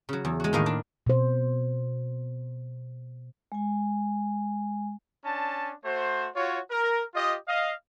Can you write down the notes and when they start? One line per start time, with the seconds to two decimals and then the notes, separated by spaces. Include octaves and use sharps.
0.09 C#3 F#3
0.25 E2
0.40 G#3 F#4
0.53 A2 D#3 A#3 D#5 F5
0.66 D4
1.07 B2 C5
3.52 G#3 G#5
5.25 C#4 D4 A5
5.85 A3 F#4 C5
6.36 F4 F#4 C#5
6.71 A#4
7.15 F4 G4 D#5
7.48 D#5 F5